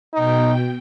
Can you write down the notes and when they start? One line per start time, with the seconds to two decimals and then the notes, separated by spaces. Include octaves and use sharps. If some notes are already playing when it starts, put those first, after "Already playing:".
0.13 B2 D#4 G5